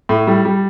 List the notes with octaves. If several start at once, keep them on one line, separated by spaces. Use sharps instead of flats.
A2
G3
G3